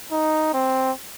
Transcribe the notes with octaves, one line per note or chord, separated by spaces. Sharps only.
D#4
C4